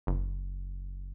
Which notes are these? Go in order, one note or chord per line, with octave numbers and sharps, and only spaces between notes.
F#1